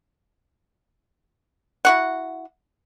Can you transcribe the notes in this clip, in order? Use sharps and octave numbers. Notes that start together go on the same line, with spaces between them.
E4 F#4 F#5